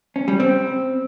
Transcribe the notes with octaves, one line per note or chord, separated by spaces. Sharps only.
C#4
G3
C4